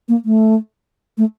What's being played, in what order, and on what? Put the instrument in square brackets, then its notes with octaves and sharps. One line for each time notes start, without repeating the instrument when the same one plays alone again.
[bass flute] A#3
A3
A3